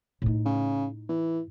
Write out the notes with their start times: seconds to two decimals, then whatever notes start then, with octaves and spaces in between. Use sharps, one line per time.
0.22 A2 D#4
0.45 C#3
1.09 E3